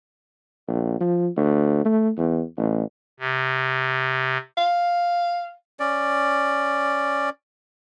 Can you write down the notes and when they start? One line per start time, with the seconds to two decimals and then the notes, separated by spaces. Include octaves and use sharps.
0.68 A#1
1.01 F3
1.37 D2
1.85 A3
2.18 E2
2.58 A1
3.20 C3
4.57 F5
5.80 C#4 D5